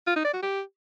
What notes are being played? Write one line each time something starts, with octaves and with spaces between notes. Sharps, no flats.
F4
D#4
D5
F#4
G4